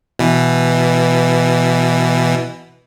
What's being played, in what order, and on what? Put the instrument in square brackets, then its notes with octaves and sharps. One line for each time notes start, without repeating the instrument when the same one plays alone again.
[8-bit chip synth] B2 E3